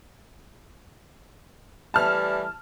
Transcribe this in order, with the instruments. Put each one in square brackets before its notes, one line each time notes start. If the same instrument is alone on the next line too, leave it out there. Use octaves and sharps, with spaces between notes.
[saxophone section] E3 G3 A3 [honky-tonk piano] A5 F6